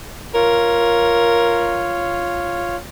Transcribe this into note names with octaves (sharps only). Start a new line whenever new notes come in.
F4 A#4 C#5